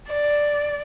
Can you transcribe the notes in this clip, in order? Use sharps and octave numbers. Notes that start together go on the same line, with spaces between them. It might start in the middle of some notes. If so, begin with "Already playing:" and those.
D5